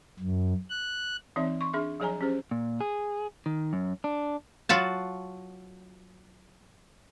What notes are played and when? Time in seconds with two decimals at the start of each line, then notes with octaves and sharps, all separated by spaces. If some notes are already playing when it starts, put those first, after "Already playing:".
0.20 F#2
0.69 F#6
1.36 E3 C4 D#4 C#5 E5
1.61 C6 C#6
1.73 D4 G#4 E5 C6
2.00 F3 F#3 G#4 C#5 G#5 A#5
2.21 C#4 G4 G#4 C5
2.51 A#2
2.81 G#4
3.46 D#3
3.73 F#2
4.04 D4
4.69 F#3 F4 F#4 A5